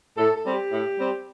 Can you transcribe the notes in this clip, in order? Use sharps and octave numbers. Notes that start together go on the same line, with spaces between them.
A2 A4
A4
G3 C4
G4
A2
G3 C4